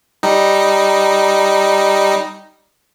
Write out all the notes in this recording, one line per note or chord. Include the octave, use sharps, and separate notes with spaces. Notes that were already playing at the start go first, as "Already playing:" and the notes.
G3 D#4